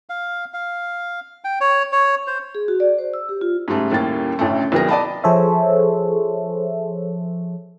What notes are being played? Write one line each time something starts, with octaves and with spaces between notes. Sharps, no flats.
F5
F5
G5
C#5
C#5
C5
G#4
F#4
D5
C5
E6
G4
F4
G#2 C#3 G3 A3
D#2 A2 G3 A#3 C#4 A6
A1 D2 C#3 A3
C2 D#3 F#3 B3 G#4 A#6
D5 D#5 A5 B5
F3 G#4 A4 C5 C#5 E5